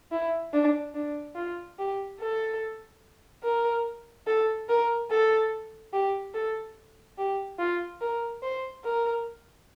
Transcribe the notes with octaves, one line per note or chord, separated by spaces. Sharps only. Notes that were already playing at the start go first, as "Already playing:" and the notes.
E4
D4
D4
F4
G4
A4
A#4
A4
A#4
A4
G4
A4
G4
F4
A#4
C5
A#4